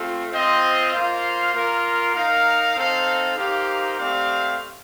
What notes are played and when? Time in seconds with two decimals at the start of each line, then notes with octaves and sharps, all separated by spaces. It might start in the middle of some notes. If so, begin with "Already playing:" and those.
Already playing: A3 C4 F4 A4
0.30 C4 F4 C5 D#5 G5
0.92 A#3 F4 C5 F5
1.53 A#3 F4 A#4
2.14 D#4 A#4 F5
2.75 C4 D#4 A4 C5 F5
3.36 A#3 D#4 G4 C5 F5
3.97 A3 C4 G4 D5 F5